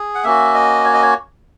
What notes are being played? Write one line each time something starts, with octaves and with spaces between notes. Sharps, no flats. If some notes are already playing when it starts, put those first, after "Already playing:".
Already playing: G#4
F#5
A#3 C#4 F#4 E5
D#5
C#5
D#5
C#5